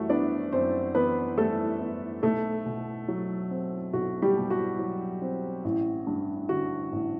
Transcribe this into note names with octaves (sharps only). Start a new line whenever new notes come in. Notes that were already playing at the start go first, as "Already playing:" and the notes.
Already playing: F#2 E3 G3 A3 F#4
B3 D4 D5
F#2 C4 C5
E3 B3 B4
G3 A3 A4
B3
B1 A3 A4
B2
F#3
C4
B1 F#4
G3 G4
B2
F#4
F#3
C4
A1
G2
D3 F#4
A1